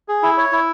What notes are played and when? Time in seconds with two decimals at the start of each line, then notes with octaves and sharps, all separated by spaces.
0.08 G#4
0.23 E4
0.37 C#5
0.52 E4